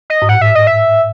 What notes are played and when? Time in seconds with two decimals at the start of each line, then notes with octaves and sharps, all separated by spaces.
0.10 D#5
0.22 G#2
0.29 A2 F#5
0.41 E5
0.55 D#5
0.67 E5